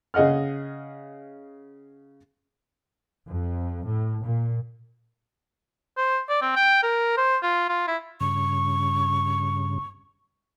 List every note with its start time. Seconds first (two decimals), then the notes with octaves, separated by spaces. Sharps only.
0.14 C#3 G#4 D#5 F#5 F6
3.30 F2
3.85 A2
4.22 A#2
5.97 C5
6.29 D5
6.42 C4
6.56 G5
6.83 A#4
7.17 C5
7.43 F4
7.69 F4
7.88 E4
8.20 G2 C#3 C#6